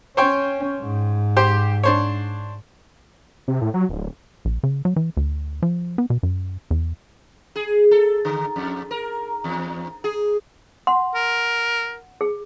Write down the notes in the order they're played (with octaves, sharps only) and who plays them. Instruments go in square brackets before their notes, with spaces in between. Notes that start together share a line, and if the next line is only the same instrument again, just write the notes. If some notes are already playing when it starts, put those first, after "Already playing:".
[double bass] C#4 [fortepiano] C5 C#5 G5
[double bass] G#2
[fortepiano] G4 C5 G5
D4 C5 C#5
[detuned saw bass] C3
A2
F#3
D1
[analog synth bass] A#1
C#3
F#3
E3
D2
F3
B3
B2
F#2
E2
[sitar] G#4
A4
D3
F2
A#4
E2
G#4
[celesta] F#5 [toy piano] C6
[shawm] A#4
[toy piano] G#4